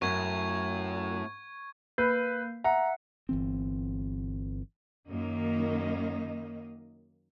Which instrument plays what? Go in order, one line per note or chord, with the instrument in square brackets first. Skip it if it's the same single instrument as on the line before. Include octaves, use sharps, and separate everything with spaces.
[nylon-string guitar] F#2 [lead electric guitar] A2 [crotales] C#6 G#6
[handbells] A#3 G6 C7 [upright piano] B4
[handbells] E5 F#5 [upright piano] A#5
[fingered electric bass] G1 E3 C4
[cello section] F#2 D#3 A#3 D#5